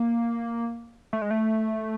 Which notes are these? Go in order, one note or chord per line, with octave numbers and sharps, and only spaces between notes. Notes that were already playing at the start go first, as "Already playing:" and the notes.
Already playing: A#3
A3
G#3
A3